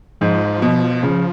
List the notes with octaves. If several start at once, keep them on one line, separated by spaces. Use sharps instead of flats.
G#2 F3
B2
C#3